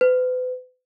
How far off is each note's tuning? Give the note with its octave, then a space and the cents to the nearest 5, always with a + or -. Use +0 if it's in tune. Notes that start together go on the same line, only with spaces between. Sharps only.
B4 +40